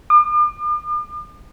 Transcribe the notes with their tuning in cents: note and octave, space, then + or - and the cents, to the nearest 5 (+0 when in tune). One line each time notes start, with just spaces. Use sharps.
D6 +45